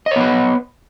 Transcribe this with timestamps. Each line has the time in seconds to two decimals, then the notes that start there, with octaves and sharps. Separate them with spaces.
0.06 D#5
0.11 C#5
0.16 B3
0.21 B4